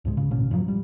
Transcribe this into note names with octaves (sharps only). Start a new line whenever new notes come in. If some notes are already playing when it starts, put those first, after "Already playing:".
C#2 G#2 G#3
C#3
A1 B2 A#3 C#4
F#2 A2 F3 F#3
G3